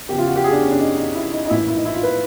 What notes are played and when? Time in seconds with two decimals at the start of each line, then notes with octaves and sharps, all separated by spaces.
0.09 E2 C#3 F3 G4
0.18 F4
0.27 F#4
0.36 G4
0.44 G#4
0.53 D4
0.62 C#4
0.71 D4
0.80 D#4
0.98 D#4
1.15 E4
1.32 D#4
1.46 D#4
1.50 A#1 A2 E3 E4
1.68 E4
1.76 D#4
1.85 E4
1.94 F4
2.03 B4